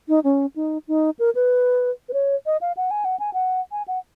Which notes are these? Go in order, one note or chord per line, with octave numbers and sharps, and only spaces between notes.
D#4
C#4
D#4
D#4
A#4
B4
B4
C#5
D#5
F5
F#5
G#5
F#5
G#5
F#5
G#5
F#5